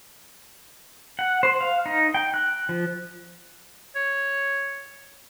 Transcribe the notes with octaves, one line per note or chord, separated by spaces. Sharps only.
F#5
C5
F5
D#4
G5
F#6
F3
C#5